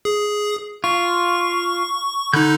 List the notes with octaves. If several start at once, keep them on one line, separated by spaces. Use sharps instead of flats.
G#4
F4 C#6
D3 D#4 B5 F#6 G6